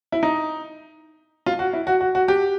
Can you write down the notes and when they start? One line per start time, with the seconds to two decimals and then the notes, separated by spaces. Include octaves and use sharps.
0.12 E4
0.23 D#4
1.46 F4
1.59 F#4
1.73 E4
1.87 F#4
2.01 F#4
2.15 F#4
2.28 G4